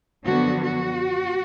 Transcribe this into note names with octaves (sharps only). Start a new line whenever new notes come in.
F#2 D3 F3 B3 F#4
F#4